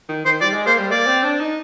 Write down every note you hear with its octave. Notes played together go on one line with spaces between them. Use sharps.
D#3
D#3 C5
G3 D5
G#3
A#3 C5
G3
A#3 D5
C4
D4
D#4